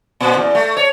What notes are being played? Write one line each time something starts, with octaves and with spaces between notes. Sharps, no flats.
A#2
E2
A3
C#5